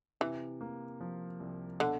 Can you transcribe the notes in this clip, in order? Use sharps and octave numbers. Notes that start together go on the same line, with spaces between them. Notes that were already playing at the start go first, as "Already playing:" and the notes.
C3 E3
A#3
F3
C2
B2 D3